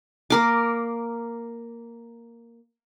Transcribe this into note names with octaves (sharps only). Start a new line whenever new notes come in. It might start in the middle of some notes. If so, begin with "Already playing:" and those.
A#3 A#4 D6